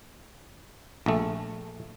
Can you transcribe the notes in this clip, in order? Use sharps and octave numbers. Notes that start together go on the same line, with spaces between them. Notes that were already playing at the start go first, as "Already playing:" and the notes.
A#1 A3